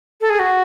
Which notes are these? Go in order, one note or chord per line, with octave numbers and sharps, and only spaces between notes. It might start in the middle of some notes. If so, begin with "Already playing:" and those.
A4
G#4
F#4